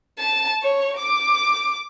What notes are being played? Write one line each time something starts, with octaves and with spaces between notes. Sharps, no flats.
A5
C#5
D6